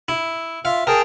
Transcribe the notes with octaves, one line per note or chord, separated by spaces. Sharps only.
E4
F4 E5 F5
G#4 A#4 G5 A5